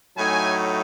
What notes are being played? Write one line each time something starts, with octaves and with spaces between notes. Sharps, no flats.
A2 F#3 A3 D#4 G#5